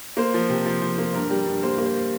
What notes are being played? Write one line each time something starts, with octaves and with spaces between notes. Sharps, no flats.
A#3 C5
F3
C3
F3
F3
A#3
G2 A#4
G3
G2
A#3 C5
A#3
C5